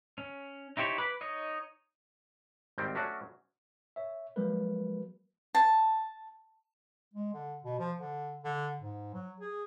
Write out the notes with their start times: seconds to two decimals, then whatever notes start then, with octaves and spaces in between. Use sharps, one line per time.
0.18 C#4
0.77 D#4 E4 G4 C5 C#5
0.98 B4 B5 D6
1.21 D#4 C#5 D#5
2.78 G#1 D#3 G3 C4 G5
2.95 F#3 A3 C#4 D4 F#4
3.96 C#5 E5
4.36 F3 F#3 G#3 A#3 A#4 B4
5.55 A5
7.13 G#3
7.33 D3
7.64 B2
7.79 F3
7.98 D3
8.43 D3
8.80 G#2
9.14 F#3
9.40 G#4